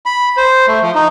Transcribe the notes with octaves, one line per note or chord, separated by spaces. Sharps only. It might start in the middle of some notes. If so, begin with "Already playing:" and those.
B5
C5
A3
F3
D#4